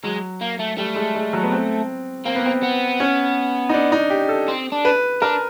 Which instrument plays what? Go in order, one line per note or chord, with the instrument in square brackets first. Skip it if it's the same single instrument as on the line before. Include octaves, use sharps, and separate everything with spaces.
[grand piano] F#3 [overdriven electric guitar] G#3
[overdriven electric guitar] A#3
A3
[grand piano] G3 [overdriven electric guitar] A3
[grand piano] G#3
G#3
F#3
B3
C4
[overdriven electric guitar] A#3 [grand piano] C4
[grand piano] B3
C4
[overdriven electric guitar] B3
[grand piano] C#4
D#4
D4
D#4
G4
A4
[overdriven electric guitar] C4
D4
[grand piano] B4
[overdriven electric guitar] D4 [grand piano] A#4